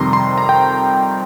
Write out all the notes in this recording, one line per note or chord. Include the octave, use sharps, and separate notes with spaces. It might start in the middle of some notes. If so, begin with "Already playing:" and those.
Already playing: F2 C3 D#3 G3 A#5 C6
C6
A#5
G5